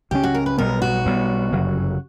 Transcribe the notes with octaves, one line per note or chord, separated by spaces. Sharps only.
C#2 C#3 F#3 C#4 G4
F#4
A#4
B4
B1 B2 G3 B3 A#4
F#4
B1 B2 G3 B3
G1 F#2 C#3 F#3